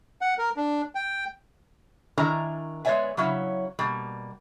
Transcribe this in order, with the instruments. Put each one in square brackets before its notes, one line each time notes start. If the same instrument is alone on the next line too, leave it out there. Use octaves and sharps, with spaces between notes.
[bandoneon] F#5
A#4
D4
G5
[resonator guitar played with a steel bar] D#3 D4 E4 A#4 G#5 A#5
G#3 B3 C#5 D5 E5 G#5
C#3 F#3 C#4 E4
B2 G3 A#3